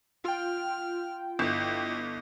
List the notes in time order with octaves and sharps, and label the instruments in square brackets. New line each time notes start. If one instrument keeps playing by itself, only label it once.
[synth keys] F4 G5 [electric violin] F6
[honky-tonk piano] G1 [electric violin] E4 D#5